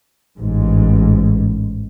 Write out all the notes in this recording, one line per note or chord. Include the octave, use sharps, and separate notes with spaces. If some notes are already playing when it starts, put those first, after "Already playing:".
A1 G#2